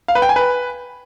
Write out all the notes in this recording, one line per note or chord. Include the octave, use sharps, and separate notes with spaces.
F5
B4
G5
G#5
B4